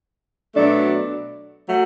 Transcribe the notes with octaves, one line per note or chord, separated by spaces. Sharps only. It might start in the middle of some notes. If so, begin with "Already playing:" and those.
B2 F#3 A3 D4
F#3 A3